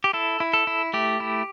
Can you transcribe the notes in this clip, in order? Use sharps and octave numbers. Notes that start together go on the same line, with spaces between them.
G4
E4 A4
E4
A4
E4
A3 G4
E4